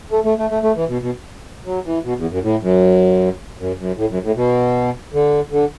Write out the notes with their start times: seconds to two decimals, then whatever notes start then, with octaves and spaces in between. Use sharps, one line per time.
0.11 A3
0.24 A3
0.38 A3
0.50 A3
0.63 A3
0.76 E3
0.89 B2
1.01 B2
1.66 F#3
1.85 E3
2.04 B2
2.17 E2
2.30 F#2
2.43 A2
2.62 F#2
3.59 F#2
3.79 F#2
3.97 A2
4.10 F#2
4.23 A2
4.36 B2
5.13 D3
5.51 D3